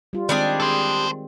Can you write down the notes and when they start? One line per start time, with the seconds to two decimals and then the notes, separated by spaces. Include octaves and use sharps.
0.13 G3 F4
0.29 D#3 G3 G#3 C4 D4 G#4
0.60 A4 C5